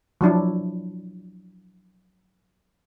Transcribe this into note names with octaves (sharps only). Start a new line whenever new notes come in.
F3 F#3 D4 E4